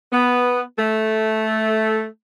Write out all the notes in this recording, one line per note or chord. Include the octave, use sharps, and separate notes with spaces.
B3
A3